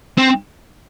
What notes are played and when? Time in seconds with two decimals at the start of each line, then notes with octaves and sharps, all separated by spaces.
0.18 C4